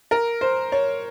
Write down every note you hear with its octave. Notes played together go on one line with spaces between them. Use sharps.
A#4
C5
C#5